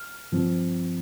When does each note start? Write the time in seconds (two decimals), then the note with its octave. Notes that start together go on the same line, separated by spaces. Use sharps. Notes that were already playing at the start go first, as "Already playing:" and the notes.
Already playing: F6
0.32 G2 F3 C4